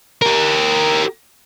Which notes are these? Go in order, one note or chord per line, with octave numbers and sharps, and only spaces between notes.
G4 A#4